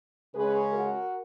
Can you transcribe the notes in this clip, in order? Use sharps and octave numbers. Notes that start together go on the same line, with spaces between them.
C#3 G#3 C#4 G#4 B4
F#4 A#4